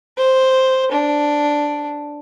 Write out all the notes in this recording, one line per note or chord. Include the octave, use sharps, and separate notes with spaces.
C5
D4